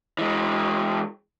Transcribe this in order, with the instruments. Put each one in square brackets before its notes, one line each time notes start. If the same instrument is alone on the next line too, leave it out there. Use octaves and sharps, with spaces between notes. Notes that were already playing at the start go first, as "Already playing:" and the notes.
[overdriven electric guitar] E3 G#3